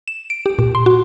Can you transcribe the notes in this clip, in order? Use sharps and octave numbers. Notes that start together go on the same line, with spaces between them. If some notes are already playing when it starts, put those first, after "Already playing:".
E7
D7
G4
A#2
C6
F#4